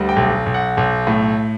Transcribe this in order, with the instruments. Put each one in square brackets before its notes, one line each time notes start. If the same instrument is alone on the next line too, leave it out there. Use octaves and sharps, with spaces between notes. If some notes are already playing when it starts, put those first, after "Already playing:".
Already playing: [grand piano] D2 G3
G5
B1
B1
F#5
B1
A2